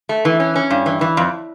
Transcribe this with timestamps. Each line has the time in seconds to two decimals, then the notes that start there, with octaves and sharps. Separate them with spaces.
0.09 A3
0.25 E3
0.40 C#4
0.56 C#4
0.70 G2
0.86 E3
1.01 E3
1.17 F2